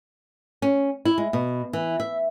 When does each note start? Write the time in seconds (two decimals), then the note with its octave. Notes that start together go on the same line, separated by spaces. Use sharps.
0.62 C#4
1.05 E4
1.18 G#3
1.33 B2
1.73 E3
2.00 E5